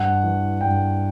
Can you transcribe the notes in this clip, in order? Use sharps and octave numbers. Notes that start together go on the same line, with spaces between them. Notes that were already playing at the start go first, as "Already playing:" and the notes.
Already playing: G2 F#5
E3
G2 G5